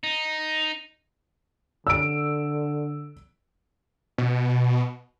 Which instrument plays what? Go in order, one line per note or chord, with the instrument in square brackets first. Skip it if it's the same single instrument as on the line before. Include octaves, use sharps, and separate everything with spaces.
[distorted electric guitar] D#4
[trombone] D3 [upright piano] E6 D7
[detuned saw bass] B2